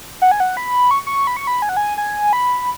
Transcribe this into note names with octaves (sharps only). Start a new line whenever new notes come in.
F#5
G#5
F#5
B5
C#6
C#6
B5
C#6
B5
G#5
F#5
G#5
G#5
B5